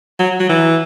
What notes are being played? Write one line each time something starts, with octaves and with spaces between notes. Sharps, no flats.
F#3
F#3
E3